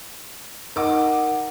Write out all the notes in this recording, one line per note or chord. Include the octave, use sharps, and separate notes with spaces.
D#4 A#4 F#5 D6